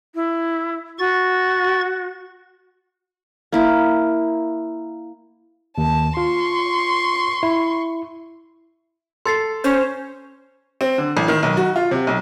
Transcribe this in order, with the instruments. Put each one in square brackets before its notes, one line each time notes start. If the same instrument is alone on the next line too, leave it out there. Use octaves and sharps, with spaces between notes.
[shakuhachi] E4
[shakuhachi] F#4 [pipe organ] C#6 A6
[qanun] A#3 E4 A#4
[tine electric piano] D#2 [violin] A5
[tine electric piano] F4 [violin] C6 C#6
[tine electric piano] E4
[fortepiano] A4 [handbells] C6 A6 C7
[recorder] C#4 [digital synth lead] C5
[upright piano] C4
D3
A1
D#3
B1
F#4
F4
C3
B1